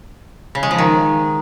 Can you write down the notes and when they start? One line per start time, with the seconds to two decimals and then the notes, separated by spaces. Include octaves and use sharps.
0.55 C#3
0.63 G#3
0.71 F3
0.78 D#3